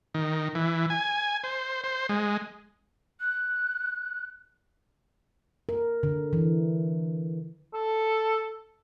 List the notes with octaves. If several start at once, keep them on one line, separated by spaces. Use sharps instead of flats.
D#3
E3
G#5
C5
C5
G#3
F#6
A#4
D3
E3
A4